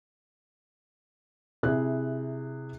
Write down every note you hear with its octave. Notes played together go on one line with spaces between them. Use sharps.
C3 E4 G#4 F#6